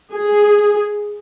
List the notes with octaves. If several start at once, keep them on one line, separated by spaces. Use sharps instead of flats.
G#4